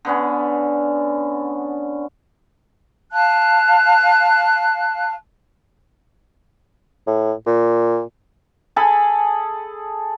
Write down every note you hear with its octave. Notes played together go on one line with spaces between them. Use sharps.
D3 B3 C#4
F5 A5 F#6
A2
A#2
G#4 A4 G#5 B5